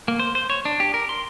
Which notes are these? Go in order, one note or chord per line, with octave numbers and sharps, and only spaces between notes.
A#3
C5
C5
C#5
D4
G4
A#4
C6